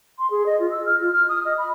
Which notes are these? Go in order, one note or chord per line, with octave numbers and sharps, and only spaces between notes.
C6
G#4
D#5
F4
E6
F6
F4
F6
D#6
D#5
B5